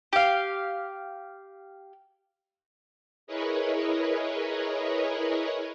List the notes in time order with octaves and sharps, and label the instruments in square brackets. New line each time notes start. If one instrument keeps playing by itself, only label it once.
[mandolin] G4 F5
[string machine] E4 G#4 A#4 B4 C#5 D#5